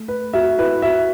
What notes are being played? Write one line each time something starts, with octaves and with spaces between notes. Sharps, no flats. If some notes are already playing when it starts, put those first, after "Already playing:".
Already playing: A3
B4
F#4 E5
E4 B4
F#4 E5